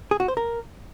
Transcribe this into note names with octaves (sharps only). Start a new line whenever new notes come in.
G#4
F#4
C5
A#4